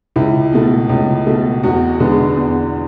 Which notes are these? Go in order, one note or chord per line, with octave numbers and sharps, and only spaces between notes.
C#2 E4
B2 A3
C#2
B2 A3
E2 F#4
D3 G#3 B3
E2